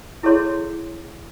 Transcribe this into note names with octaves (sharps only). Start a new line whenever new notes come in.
E4 G#4 A4 C#5 C6